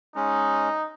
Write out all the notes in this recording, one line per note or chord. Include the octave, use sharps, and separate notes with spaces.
G#3 C#4 D#4